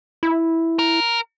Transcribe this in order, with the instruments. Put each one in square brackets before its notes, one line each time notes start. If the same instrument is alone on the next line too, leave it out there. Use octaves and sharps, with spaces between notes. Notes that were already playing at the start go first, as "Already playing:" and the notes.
[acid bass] E4
[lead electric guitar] A#4